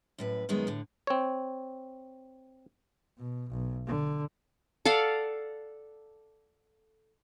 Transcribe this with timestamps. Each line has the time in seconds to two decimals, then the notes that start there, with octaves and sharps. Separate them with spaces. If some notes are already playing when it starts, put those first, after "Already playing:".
0.18 F#2 A2 B4
0.49 F#2 D#3 G#3 B3
0.67 A2 D3
1.07 C4 C#5
3.18 B2
3.50 B1
3.87 D3
4.85 A4 D5 F5 F#5